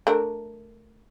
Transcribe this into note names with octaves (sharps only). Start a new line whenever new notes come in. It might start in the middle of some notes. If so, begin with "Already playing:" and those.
A3 D4 A#4